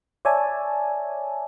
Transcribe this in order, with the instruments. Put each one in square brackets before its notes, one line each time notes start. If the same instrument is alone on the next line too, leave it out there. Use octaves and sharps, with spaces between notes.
[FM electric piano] C#5 D5 E5 G#5 A5